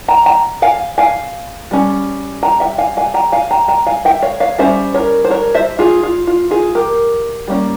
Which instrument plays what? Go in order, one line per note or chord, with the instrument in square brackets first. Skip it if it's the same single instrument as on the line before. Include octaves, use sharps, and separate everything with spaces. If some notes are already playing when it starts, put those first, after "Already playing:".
[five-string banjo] G5 A#5
G5 A#5
F5 G#5
F5 G#5
G3 C#4
G5 A#5
E5 G5
F5 G#5
F5 G#5
G5 A#5
F5 G#5
G5 A#5
G5 A#5
F5 G#5
E5 G5
C#5 F5
C#5 F5
G3 C#4 C5 E5
A#4 C#5
C5
A#4 C#5
C5 E5
F4 G#4
F4
F4
F4 G#4
G4 A#4
G3 A#3 C#4